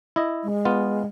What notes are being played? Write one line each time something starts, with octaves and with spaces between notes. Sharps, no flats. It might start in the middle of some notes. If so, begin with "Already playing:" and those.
E4 D#5
G#3
B3 F4